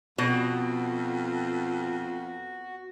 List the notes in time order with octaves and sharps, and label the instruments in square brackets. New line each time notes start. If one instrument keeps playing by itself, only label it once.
[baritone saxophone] F2 [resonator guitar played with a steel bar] B2 [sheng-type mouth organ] F#4